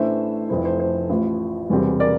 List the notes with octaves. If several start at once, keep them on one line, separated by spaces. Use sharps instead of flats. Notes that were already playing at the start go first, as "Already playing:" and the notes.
Already playing: A1 A2 E3 A3 D4 C5 E5
F1 F2 E3 A3 E4 C5
C5
C5
A1 A2 F3
E1 E2 C3 G3 C4
A#4 D5